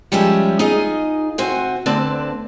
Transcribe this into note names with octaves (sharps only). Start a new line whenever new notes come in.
F3 G3 G#3 C#4 G4 E5
D#4 F4 G#4 D#5
C3 C4 F#4 C5 G#5
D2 D3 C4 B4 D5 A5